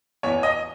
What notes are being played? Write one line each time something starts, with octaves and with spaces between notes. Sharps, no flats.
E2 C#5
D#5